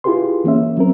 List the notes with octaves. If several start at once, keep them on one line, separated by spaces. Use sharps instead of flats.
E4 F4 G4 G#4 B4 C6
E3 A#3 C#4 E5
F#3 C4 A#4